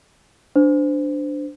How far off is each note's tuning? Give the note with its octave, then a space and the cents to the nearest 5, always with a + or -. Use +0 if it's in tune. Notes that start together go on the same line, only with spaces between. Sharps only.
D4 +0 C5 -25